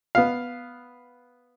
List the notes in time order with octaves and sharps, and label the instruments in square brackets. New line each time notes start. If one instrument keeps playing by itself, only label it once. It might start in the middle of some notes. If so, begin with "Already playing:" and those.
[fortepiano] B3 F5